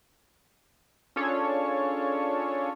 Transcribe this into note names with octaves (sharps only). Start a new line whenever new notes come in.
C#4 D4 F4 G#4 A4 C#5